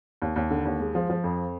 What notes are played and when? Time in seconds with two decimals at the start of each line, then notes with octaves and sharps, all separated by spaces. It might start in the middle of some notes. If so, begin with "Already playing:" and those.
0.22 D#2
0.36 D#2
0.51 D3
0.65 D#2
0.80 G#3
0.95 F3
1.10 F3
1.24 F2